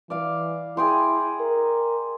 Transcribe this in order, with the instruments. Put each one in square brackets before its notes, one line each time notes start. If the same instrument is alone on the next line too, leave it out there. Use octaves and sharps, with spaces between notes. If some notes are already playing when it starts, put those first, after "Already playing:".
[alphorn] E3 [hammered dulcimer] D5 F5
[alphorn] E4 [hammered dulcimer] G#4 G5 C6
[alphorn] A#4